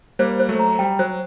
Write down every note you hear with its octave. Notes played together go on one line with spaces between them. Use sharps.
G3 A#3 C5
C5
F#3 A3
A#5
G3 G5
F#3 C5